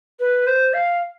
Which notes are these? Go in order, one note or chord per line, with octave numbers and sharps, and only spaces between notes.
B4
C5
F5